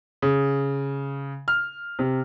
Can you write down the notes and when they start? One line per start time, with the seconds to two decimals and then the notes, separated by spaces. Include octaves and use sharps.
0.22 C#3
1.48 F6
1.99 C3